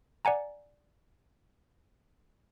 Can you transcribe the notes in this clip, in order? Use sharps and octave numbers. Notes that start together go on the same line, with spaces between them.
D5 F#5 G#5 A#5